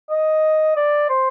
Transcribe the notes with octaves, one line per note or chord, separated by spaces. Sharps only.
D#5
D5
C5